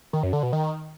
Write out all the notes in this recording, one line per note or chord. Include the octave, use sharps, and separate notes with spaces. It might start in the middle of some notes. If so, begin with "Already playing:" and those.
D#3
F#2
D3
B2
D#3